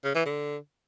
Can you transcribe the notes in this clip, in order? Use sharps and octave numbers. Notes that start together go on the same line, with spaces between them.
C#3
E3
D3